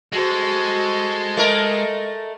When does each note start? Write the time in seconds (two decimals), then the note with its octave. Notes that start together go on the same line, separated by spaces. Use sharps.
0.13 G#3 F#4 A4 C5
1.37 A3 A#4 D#5